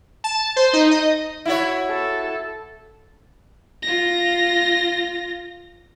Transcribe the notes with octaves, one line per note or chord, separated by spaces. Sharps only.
A5
C5
D#4
D#5
E4 F#4 C#5
A4
F4 A#6